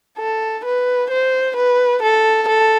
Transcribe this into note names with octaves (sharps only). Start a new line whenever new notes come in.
A4
B4
C5
B4
A4
A4